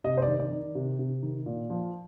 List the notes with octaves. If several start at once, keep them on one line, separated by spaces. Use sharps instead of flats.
C3 D#5
C5
D5
D#3
D5
D#3
C3
C3
D#3
A#2
F3